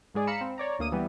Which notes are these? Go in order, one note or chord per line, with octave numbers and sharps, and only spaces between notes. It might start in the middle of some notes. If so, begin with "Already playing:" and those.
G#2 G#3 G#4 D5
F5 A#5 B5 C#7 E7
C4
C#5 D5 A#5
D2 A#3 D#6 D#7
E3 G3 B3